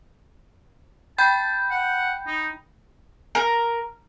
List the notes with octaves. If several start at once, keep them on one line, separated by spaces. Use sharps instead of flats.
G5 A5 B5 G6
F#5
D#4
A#4